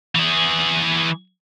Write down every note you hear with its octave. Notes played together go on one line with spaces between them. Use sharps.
E3 G#4